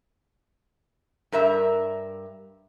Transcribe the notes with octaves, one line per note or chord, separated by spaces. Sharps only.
G2 A#4 E5